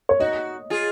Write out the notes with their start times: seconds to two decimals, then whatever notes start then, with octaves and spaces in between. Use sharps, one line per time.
0.09 C#5
0.20 D#4 F#4 D#5
0.70 F4 G#4